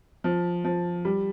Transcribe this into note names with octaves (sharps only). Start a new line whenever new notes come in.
F3
F3
G3